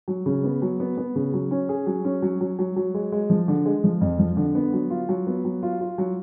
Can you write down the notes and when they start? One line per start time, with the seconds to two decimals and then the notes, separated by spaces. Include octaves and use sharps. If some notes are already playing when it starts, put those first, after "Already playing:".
0.08 F#3
0.26 C#3
0.44 B3
0.62 F#3
0.80 B3
0.98 B3
1.15 C#3
1.33 F#3
1.51 C#4
1.69 G#4
1.86 F#3
2.05 C#4
2.22 F#3
2.41 F#3
2.59 F#3
2.76 F#3
2.94 G#3
3.12 G#3
3.30 F3
3.48 D3
3.66 G#3
3.84 F3
4.01 F2
4.19 F3
4.37 D3
4.55 B3
4.73 F#3
4.90 F4
5.09 F#3
5.27 B3
5.45 F#3
5.63 F4
5.81 F4
5.98 F#3